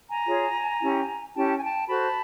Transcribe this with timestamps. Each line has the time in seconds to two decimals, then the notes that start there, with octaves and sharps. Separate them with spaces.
0.09 G#5 A#5
0.27 F4 G#4 C#5
0.81 C#4 E4 G4
1.35 C#4 E4 G4 G5 A5
1.56 G#5
1.61 G5 A5
1.88 F#4 A4 C5 A5 B5